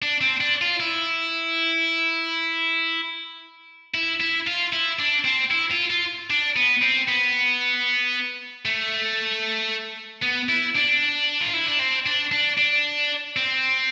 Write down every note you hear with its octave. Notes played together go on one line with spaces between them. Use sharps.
D4
C4
D4
F4
E4
E4
E4
F4
E4
D4
C4
E4
F4
F4
D4
B3
C4
B3
A3
B3
E4
D4
F4
E4
D4
C4
D4
D4
D4
C4